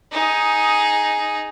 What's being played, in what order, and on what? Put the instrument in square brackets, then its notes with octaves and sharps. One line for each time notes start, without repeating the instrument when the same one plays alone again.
[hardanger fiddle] D#4 G#4